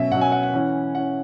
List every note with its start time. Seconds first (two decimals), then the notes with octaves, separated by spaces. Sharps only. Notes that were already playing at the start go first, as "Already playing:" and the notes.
Already playing: B2 F#3 C#4 E5
0.12 B2 F#3 C#4 F#5
0.21 G#5
0.32 F#5
0.43 F#5
0.53 E3 C#4
0.95 E3 C#4 F#5